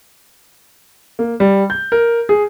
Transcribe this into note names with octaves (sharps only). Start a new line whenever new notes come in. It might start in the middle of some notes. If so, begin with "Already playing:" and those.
A#3
G3
G6
A#4
G#4